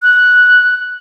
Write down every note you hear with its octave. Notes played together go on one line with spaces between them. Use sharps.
F#6